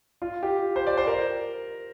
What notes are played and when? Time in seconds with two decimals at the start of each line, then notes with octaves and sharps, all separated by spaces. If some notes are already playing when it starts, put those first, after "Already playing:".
0.22 F4
0.43 G4
0.76 C5
0.87 D5
0.97 C5
1.07 A#4